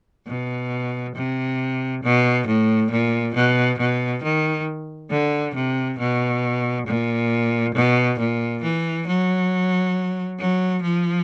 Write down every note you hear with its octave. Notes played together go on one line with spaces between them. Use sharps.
B2
C3
B2
A2
A#2
B2
B2
D#3
D3
C3
B2
A#2
B2
A#2
E3
F#3
F#3
F3